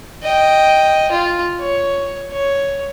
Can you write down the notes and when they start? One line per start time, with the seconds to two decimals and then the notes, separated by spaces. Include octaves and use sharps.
0.23 D#5 G5
1.11 F4
1.59 C#5
2.32 C#5